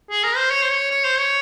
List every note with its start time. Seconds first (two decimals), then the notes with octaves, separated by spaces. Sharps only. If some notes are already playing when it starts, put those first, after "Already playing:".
0.10 G#4
0.24 A#4
0.36 C5
0.50 C#5
0.63 C5
0.71 C#5
0.91 C#5
1.05 C5
1.19 C#5